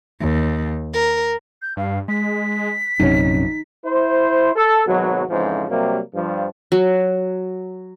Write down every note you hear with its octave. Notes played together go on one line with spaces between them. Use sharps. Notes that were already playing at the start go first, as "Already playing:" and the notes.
D#2
A#4
G6
G2 F5
G#3 B6
A#1 F#2 C3 C#4 D#4
E4 C5
A4
G#1 B2 F#3
F2 G#2 C#3 E3 F3
C3 F#3 G3 A#3
G2 F3
F#3